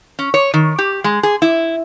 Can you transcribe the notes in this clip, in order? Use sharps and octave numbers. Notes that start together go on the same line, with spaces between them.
C#4
C#5
D#3
G4
G#3
G#4
E4